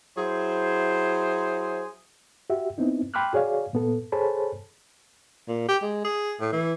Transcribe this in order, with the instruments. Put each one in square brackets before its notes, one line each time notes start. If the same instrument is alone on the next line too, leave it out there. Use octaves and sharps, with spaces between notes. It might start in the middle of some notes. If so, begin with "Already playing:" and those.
[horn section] F#3 E4 G#4 C5
[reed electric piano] F#4 G4 E5
B3 C4 D#4 E4
G5 B5 C6 D6 F6 F#6
F#4 G#4 C#5 D5 F5
A#2 B3 A4
G#4 A4 C5 C#5 A5 B5
[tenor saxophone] A#2
G4
G#3
G#4
A2
E3